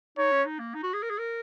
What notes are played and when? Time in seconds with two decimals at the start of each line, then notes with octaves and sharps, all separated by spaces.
0.17 D#4 C#5
0.32 C#4
0.46 D#4
0.59 A#3
0.75 D#4
0.83 F#4
0.93 G#4
1.03 A#4
1.10 G#4
1.19 A#4